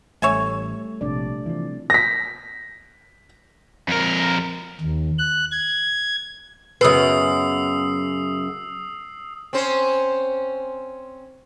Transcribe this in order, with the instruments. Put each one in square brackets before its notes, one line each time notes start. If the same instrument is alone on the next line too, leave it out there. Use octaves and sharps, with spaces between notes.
[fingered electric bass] A1 [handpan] G3 A3 [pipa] C#5 E5 G#5
[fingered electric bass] A#1 [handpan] C3 D4 D5
[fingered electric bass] E3 F3
[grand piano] A#6 B6
[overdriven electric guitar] F2 A#4
[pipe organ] D#2
F#6
G#6
[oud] F#2 C#3 B3 [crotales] D#6 E6 C7
[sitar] C4 C#4 C5